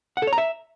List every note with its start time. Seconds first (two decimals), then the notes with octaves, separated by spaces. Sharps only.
0.17 F#5
0.22 A4
0.27 C#5
0.33 A#5
0.38 E5